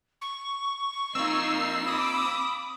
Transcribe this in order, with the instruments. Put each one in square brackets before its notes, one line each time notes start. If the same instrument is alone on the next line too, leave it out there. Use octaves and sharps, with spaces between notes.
[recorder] C#6
[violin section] A#3 D#4 C7 [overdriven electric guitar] C4 F4 [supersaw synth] E6
[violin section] B5 D6 [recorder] D#6